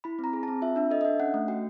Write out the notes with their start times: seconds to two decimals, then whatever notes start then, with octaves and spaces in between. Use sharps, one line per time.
0.04 E4 B5
0.19 C4
0.24 A#5
0.33 G#4
0.43 C4 A5
0.62 F4 E5
0.76 D4 E5
0.90 A4 D#5
1.01 D#5
1.05 D4 E5
1.20 C#4 F#5
1.34 A3
1.48 F#4 G5